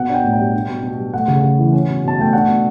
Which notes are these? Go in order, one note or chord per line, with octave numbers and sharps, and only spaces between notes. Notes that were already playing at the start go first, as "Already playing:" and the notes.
Already playing: B2 B3 F#5
D4 G5
A2
G5
G3
D4
B2
B2
G3
A3 F#5
C#3
C#3
E3
C#4
B2
B2 A5
A3 G5
D4 F#5
B2